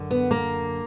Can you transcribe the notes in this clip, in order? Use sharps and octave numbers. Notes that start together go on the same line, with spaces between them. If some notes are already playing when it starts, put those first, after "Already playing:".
Already playing: F#2 D3
B3
A#3